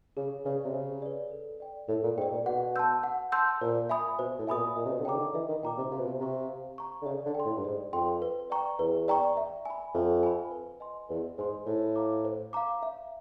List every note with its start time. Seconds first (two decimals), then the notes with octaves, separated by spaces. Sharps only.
0.17 C#3 G#4
0.45 C#3 B4 D5
0.65 C3
0.74 C#3 G#4
1.02 B4 D5
1.31 A4
1.60 D5 G5
1.89 A2 A4
2.04 A#2
2.17 G#2 D5 G5
2.32 A#2
2.46 B2 F#5
2.76 A5 C6 E6 G6
3.03 F#5
3.32 A5 C6 E6 G6
3.61 A#2 C5
3.89 E5 G#5 B5 D#6
4.19 B2 C5
4.39 A2
4.47 B2 E5 G#5 B5 D#6
4.57 A#2
4.76 A#2 D#5
4.86 C3
4.91 B2
4.99 D3
5.05 C#3 G5 A#5 D6
5.15 D#3
5.20 D3
5.34 E3 D#5
5.49 D#3
5.63 A#2 G5 A#5 D6
5.78 C3
5.91 C3 F5
5.98 B2
6.07 C3
6.20 C3 A#5 C#6
6.49 F5
6.78 A#5 C#6
7.02 D3
7.06 C#3 D5
7.26 D3
7.35 G5 C6
7.45 A2
7.57 G2
7.65 G#2 D5
7.93 F2 G5 C6
8.22 B4
8.50 D5 G5 A#5 C#6
8.79 E2 B4
9.08 D5 G5 A#5 C#6
9.37 E5
9.65 G#5 B5
9.94 F2 E5
10.23 G#5 B5
10.51 B4
10.80 D#5 G#5 C6
11.09 E2 B4
11.38 G#2 D#5 G#5 C6
11.66 A2 C5
11.96 F5 A#5 D6
12.25 C5
12.53 F5 A#5 D6
12.83 E5